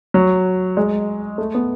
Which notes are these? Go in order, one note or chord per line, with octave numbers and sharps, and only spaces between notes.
F#3
G#3
A3
B3